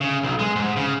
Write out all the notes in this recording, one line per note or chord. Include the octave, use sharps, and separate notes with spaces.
C#3
B1
G#3
G#2
C#3